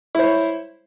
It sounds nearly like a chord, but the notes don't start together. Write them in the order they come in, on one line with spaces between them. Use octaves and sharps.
E4 C5 C#5